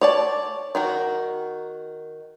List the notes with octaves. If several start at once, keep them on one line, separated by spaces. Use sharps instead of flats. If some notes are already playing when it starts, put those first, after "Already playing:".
C#5 D5 A5
D#3 F#4 A#4